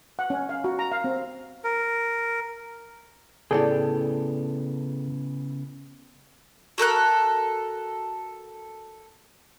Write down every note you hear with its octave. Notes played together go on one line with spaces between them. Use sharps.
F#5
C#4
F5
F#4
A#5
F5
C4
A#4
A2 C#3 B3 G#4 A4 D5 G5
F#4 A4 A#4 F#6